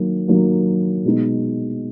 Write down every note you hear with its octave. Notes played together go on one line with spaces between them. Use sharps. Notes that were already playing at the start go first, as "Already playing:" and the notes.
Already playing: D#3 F#3 A#3
D#3 F#3 A#3
B2 G#3 D#4